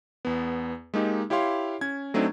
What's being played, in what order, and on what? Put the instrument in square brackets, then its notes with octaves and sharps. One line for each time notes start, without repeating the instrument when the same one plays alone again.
[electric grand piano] E2 B3
G#3 A#3 D#4 G4
E4 G4 C#5 F5 C6
C#4 G#6
F#3 A3 C4 D4 D#4